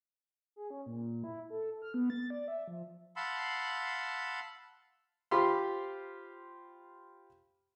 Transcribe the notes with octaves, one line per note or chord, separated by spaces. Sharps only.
G#4
C#4
A#2
E4
A4
F6
B3
A6
D5
E5
F3
F5 F#5 A5 B5 C6 E6
F4 G4 C5 B5 C6